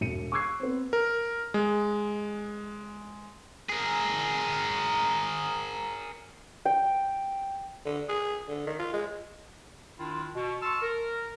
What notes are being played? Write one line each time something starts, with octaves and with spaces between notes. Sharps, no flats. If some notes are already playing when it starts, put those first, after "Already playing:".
E1 C#7 D#7
C#6 D6 E6 F#6 G#6 C7
B3 C4
A#4
G#3
G#4 A#4
G5
D3
G#4
D3
D#3
F4
G#3
D#3 D4 E4 F4
B2
A5 C6 C#6 E6 F6
A#4